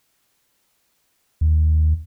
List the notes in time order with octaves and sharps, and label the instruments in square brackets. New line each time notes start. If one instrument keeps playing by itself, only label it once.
[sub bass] D#2